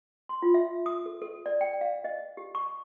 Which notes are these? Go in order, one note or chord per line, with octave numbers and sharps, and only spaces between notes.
C6
F4
E5
D#6
A4
A4
D5
G5
F5
D#5
G4
C#6